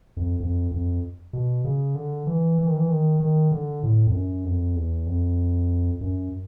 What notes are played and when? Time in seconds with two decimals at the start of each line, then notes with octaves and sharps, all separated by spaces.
0.17 F2
0.40 F2
0.71 F2
1.33 B2
1.64 C#3
1.95 D3
2.27 E3
2.58 E3
2.66 D#3
2.76 E3
2.89 D#3
3.20 D#3
3.52 D3
3.83 A2
4.07 F2
4.14 F#2
4.45 F2
4.75 E2
5.06 F2
6.01 F#2